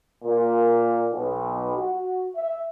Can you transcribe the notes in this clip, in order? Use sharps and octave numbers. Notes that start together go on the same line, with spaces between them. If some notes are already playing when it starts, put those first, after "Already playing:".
A#2
B1
F#4
E5